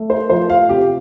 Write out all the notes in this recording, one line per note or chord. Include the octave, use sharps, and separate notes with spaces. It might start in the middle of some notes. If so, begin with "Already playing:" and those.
Already playing: A3
C5
F3 C5
F5
C3 G4